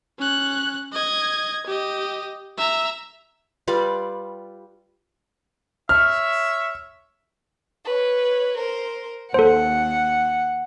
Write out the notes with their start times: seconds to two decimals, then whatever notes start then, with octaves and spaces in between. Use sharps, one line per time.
0.19 C#4 F#6
0.93 D#5 G#6
1.66 G4 D#5
2.58 E5 A#5
3.67 G3 F4 B4 D5
5.89 C#5 E5 F6
7.84 B4 C#5
8.56 A#4 C5
9.34 D#2 A4 C5 F#5